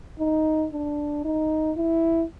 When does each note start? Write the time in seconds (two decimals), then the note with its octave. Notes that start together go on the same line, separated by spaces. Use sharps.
0.19 D#4
0.73 D4
1.25 D#4
1.77 E4